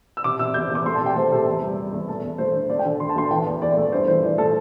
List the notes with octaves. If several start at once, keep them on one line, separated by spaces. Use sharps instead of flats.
E6
C3 D6
C3 E6
E2 G6
E2
D6
A3 C6
A5
C3 G5
A3 C5
C3 A4
E2
G3
G3
E2
A3 A4
E2
A3 C5
D3
A3 D5
G5
D3
D3 C6
A5
D2 C6
E3 G5
E2
E2 D5
A3
D5
G2 C5
E3 C5
E3 D5
A3 A4